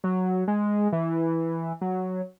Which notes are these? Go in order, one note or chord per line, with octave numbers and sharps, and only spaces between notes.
F#3
G#3
E3
F#3